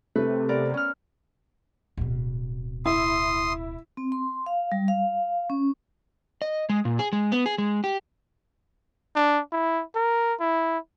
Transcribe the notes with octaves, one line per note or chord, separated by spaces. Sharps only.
C3 A3 B4
B3 A#4 D5
C#4 F6
D1 B2
E4 C6 D#6
C4
C6
F5
G3
F5
C#4
D#5
G#3
A#2
G#4
G#3
B3
G#4
G#3
G4
D4
E4
A#4
E4